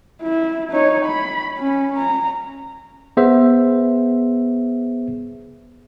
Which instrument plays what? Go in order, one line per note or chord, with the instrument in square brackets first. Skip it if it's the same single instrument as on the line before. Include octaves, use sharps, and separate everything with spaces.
[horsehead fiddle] E4
D#4 C#5
B5
C#4
A#5
[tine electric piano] B3 G#4 C5 E5